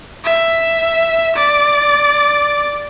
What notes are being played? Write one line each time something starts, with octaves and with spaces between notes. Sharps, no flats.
E5
D5